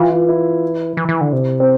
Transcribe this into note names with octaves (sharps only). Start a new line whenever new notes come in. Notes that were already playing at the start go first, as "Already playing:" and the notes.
Already playing: E3 F4
F4
E4
E3
E3
D3
C3
C4